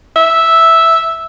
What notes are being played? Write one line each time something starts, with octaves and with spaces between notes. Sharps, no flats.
E5